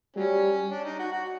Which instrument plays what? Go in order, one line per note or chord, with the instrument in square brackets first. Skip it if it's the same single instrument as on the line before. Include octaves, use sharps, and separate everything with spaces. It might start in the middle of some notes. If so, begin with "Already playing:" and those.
[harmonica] F#3 C#4 [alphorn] G3
[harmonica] D4
D#4
F#4
F#4